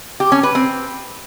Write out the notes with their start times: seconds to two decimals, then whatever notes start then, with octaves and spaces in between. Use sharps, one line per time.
0.20 G4
0.32 C#4
0.43 B4
0.55 C4